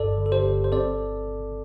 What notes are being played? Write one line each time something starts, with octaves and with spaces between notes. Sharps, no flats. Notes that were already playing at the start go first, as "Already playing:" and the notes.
Already playing: G1 G2 A4 D5
D3
A4
G4 C5
G1
C5
C4 A4 D5